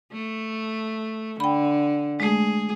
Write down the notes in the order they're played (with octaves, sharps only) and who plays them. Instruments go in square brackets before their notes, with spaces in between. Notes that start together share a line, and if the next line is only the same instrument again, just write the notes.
[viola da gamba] A3
[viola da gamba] D3 [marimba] G5 B5
[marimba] G#3 A3 [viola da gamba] G#4